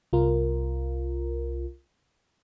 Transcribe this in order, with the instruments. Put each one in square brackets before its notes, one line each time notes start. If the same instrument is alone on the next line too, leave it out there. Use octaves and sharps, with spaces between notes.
[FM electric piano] C2 F4 A#4